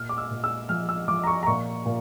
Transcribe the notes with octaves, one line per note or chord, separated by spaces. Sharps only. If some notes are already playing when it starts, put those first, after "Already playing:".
Already playing: A#2 F6
D6
E6
A#2
E6
F3 F6
E6
F3 D6
A#5
C#6
A#5
A#2 C#6
A#2